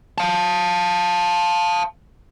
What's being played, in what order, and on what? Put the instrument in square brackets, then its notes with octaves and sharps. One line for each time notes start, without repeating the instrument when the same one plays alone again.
[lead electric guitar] F5 A5